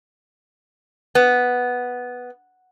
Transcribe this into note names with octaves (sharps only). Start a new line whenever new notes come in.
B3